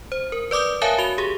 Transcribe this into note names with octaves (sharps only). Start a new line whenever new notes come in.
C5
A#4
B4 D5 D6 D#6 G6
A#4 C#5 E5 F5 G#5 A5
F#4 F7 G7
G4 G#4